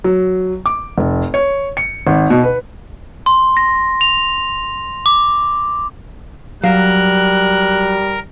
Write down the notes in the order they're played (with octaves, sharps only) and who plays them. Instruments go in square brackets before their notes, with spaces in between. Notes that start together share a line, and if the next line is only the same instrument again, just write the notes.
[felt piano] F#3
D6
F1
C#5
C#7
G#1
B2
B4
[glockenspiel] C6
A#6
F7
D6
[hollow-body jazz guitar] F#3 F5 [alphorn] G3 [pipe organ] A#4 [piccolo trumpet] F#6